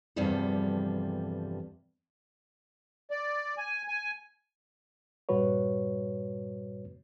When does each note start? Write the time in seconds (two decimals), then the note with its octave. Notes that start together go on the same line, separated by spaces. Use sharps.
0.16 E2 G2 C3 F3 G3 A4
3.11 D5
3.58 G#5
3.88 G#5
5.29 G2 A#2 G3 F#4 B4 C#5